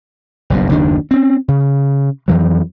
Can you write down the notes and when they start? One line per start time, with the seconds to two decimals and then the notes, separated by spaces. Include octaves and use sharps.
0.50 F#1 B1 G2
0.69 F#1 D#2 D#3 D4
1.11 C4 C#4
1.48 C#3
2.28 F2 E3 F#3